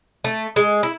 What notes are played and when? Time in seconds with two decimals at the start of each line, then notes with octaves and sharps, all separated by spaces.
0.24 A3
0.56 G#3
0.83 E4